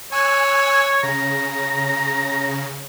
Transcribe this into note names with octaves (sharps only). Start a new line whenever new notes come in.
C#5 G#5 E6 F#6
C#3 A#5